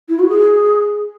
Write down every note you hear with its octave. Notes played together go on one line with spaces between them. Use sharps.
E4
F#4
G#4